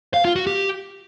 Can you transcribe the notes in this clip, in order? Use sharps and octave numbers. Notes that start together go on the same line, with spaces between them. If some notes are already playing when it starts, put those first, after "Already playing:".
F5
F4
F#4
G4